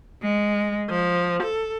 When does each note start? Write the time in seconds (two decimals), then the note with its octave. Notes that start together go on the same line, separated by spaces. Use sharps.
0.22 G#3
0.89 F3
1.43 A4